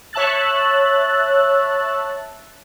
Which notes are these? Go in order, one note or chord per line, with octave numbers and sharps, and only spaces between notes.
C#5 E5 A5 E6 F#6 A6